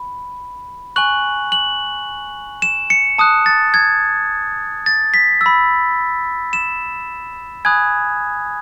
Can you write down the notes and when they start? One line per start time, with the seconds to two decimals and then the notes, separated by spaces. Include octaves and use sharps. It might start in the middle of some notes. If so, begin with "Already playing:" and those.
Already playing: B5
0.96 G#5 C#6 F#6 F#7
1.52 F#7
2.62 E7
2.90 C#7
3.18 A5 D#6 F#6
3.46 A6
3.74 G#6
4.86 A6
5.14 B6
5.41 E6
5.46 B5
6.53 E7
7.65 G#5 B5 D#6 F#6 G#6